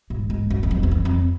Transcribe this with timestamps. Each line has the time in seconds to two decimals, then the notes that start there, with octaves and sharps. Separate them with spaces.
0.10 G#2
0.30 G#2
0.50 F#2
0.63 F#2
0.71 F2
0.83 E2
0.91 F2
1.05 F2